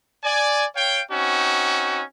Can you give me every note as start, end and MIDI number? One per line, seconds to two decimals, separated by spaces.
0.23 0.65 74
0.23 0.65 80
0.75 1.01 73
0.75 1.01 77
0.75 1.01 79
1.10 2.01 60
1.10 2.01 61
1.10 2.01 63
1.10 2.01 66